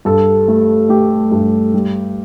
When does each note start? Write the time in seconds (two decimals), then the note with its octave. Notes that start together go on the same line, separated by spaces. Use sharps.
0.05 G2 A4
0.48 A3
0.89 A3 G4
1.32 G2
1.74 G3